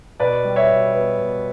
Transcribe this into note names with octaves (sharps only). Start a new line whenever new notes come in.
B2 B4 D5
G3
C#5 E5
B2
B3
B2